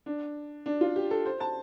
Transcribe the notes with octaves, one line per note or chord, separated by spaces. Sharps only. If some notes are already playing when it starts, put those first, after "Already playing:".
D4
D4
F4
G4
A4
C5
A5